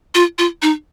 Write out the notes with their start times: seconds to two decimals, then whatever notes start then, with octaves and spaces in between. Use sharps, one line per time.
0.15 F4
0.38 F4
0.62 D#4